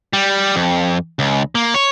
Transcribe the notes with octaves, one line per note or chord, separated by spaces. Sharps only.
G3
F2
C#2
A#3
C#5